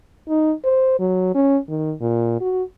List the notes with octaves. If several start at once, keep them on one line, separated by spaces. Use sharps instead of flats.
D#4
C5
F#3
C#4
D#3
A#2
F#4